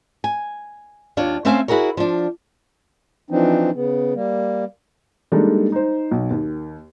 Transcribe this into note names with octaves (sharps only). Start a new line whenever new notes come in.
G#5
D#2 D4 F4 C#5
A3 C4 C#4 E5 F5 G#5
E4 F#4 G#4 A#4 C#5
F3 D4
E3 F3 C4 D4 D#4
C#3 B3
G3 A#3
G3 G#3 A#3 D4 D#4 A4
D#4 C5
B1
D#2